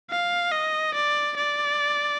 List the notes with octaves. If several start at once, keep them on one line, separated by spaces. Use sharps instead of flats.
F5
D#5
D5
D5